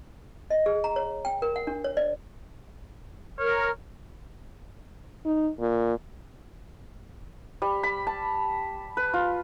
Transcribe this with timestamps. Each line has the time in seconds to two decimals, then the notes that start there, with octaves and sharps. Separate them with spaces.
0.50 D#5
0.66 G#4
0.84 A#5
0.96 C#5
1.25 G5
1.42 A#4
1.56 F#5
1.67 D4
1.84 C#5
1.97 D5
3.39 A#4 C#5 F6
5.25 D#4
5.60 A#2
7.62 G3
7.83 B5
8.07 A5
8.97 B4
9.13 F4